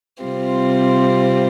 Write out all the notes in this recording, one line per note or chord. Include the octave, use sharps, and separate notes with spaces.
C3 G3 C4 F4